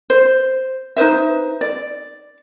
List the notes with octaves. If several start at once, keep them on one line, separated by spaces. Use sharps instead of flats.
C5
D#4 B4 C5 E5
D5